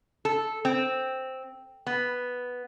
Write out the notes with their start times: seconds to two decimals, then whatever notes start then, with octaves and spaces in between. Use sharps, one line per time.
0.25 A4
0.65 C4
1.86 B3